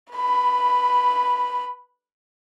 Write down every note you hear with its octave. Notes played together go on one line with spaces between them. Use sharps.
B4 B5